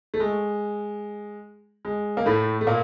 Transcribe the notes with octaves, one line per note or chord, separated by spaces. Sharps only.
A3
G#3
G#3
A#3
A2 A3
A3
A#2 A#3